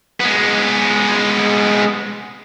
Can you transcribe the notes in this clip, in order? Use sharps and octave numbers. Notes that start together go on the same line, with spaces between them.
G#3 B3